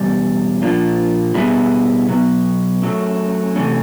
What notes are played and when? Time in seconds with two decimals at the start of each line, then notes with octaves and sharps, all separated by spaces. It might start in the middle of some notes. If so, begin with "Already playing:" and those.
Already playing: E2 B2 G3 C#4
0.62 A#2 F3 A#3 D4 F4
1.34 B2 G3 B3 E4 G#4
2.09 B2 F#3 B3
2.82 F#3 A3 C#4
3.56 C3 E3 A3 C#4